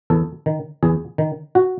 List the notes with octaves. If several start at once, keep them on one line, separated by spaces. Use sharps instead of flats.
E2 A4
D#3
E2 G#4
D#3
F#4